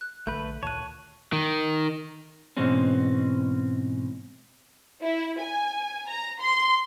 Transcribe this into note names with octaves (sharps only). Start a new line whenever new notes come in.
F#6
A#1 D3 A3 B4 G6
D2 A#2 D#3 C#5 A5 F#6 D#7
D#3
G#2 B2 E3 G#3 C4 C#4
E4
G#5
A#5
C6